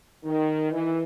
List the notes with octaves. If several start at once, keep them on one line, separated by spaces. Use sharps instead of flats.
D#3
E3